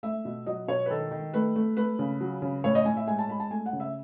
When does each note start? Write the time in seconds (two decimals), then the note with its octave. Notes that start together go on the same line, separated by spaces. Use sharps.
0.03 A3 E5
0.25 B2
0.47 F#3 D#5
0.68 B2 C#5
0.86 B4
0.90 D#3 A4
1.11 D#3
1.34 A3 B4
1.56 A3
1.77 A3 B4
1.99 C#3
2.21 F#3
2.42 C#3
2.64 A2 C#5
2.75 D#5
2.85 A2 G#5
2.97 E5
3.07 G#3 G#5
3.19 A5
3.29 G#3 B5
3.40 A5
3.50 A3 G#5
3.66 F#5
3.73 C#3
3.80 E5